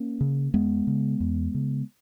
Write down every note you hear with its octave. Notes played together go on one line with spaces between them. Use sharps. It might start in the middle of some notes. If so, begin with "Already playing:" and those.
Already playing: A#3 C#4
C#3
E2 G#3 B3
C#3
E2
C#3